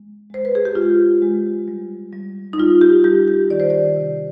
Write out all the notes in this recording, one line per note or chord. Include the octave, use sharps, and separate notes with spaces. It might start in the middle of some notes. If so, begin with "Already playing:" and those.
Already playing: G#3
G#3 C5
B4
G#4
G4
G#3 F4
G#3
G3
G3
D#4
G3 F4
G4
G3 G4
G4
D#3 D5
C5
D5
C3